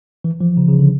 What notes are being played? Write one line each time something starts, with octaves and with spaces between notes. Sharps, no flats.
E3
F3
C#3
C#3
D3